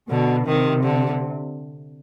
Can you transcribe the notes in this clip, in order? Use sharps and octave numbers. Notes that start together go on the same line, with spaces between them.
B2 D3
C3 D#3
D3